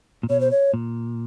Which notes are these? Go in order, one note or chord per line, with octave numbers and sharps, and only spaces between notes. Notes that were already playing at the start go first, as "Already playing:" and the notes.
A#2
B2 C#5
C5
C#5
A#2